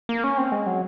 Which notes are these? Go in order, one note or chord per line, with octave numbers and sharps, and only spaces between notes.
A#3
C#4
C4
G#3
F#3